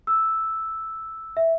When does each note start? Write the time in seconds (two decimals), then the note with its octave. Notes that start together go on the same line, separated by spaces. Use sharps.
0.07 E6
1.37 E5